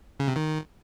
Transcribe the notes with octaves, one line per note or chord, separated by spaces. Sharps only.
C#3
C3
D#3